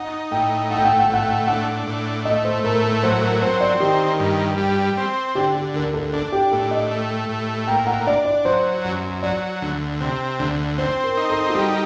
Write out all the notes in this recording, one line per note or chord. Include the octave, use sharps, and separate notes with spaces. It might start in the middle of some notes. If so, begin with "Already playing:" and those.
Already playing: D#4 F#5
A2 G5
A3 F#5
G5
F#5
G5
F#5
G5
A2 F#5
G5
F#5
D4 F#5
A2
A3 D#5
C5
A2 A#4
A#4
F#3 C5
A#4
C4 C5
D5
D#3 G4
G2
G3
C4
D3 G4
G4
D2 A#4
A4
D4 A4
G4
A2 A4
D#5
A3
A2
A#3 G5
F#5
D4 D5
D5
F#3 C5
F#2
F#3 D5
D2
C3
D2
C4 C5
A#4
D#4
A4
F#4
G3 G4